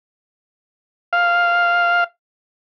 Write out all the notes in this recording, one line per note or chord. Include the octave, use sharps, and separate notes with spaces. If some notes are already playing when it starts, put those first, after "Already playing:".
F5